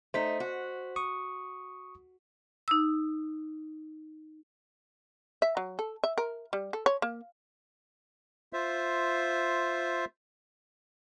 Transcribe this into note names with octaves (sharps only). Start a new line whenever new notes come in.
A3 D#4 C5 B6
F#4
C#6 D#6
D#4 E6
E5
F#3
A4
E5
A#4
G3
A4
C#5
A#3
F4 C5 E5